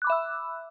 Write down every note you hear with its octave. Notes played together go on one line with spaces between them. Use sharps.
E5 B5 D6 E6 F#6